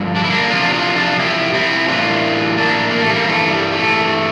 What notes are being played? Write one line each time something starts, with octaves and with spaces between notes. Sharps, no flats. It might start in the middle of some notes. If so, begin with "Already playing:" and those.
Already playing: G2 D3 F3
D4
E4
A#3 D4
E2 C3 F3 D4 F4
D4 F4
D4 F4
E4 G4
C4 E4
A2 E3 D4 F4
A#3 D4
A#3
A3
G3 A#3
G2 E3 A3
G3
A3